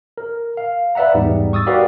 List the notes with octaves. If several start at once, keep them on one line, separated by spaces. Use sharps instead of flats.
A#4
F5
B4 D5 E5 F#5 A#5
E2 G#2 G3 D#4
C#6 D#6 E6 A6
F#4 G4 A#4 B4 D5 F5